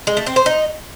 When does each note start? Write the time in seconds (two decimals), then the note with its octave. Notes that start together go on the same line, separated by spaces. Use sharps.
0.07 G#3
0.17 A3
0.26 C4
0.36 C5
0.46 D#4